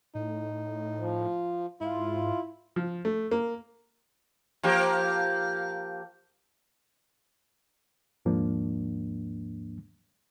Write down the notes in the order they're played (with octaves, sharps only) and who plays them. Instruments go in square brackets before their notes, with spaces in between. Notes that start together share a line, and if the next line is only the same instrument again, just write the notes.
[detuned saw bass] A2 [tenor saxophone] D#4
[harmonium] F3
[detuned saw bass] G#2 [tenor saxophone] E4 [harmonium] F4
[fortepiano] F3
A3
A#3
[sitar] F3 A#3 G4
[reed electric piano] D#2 G#2 F3 A#3 D4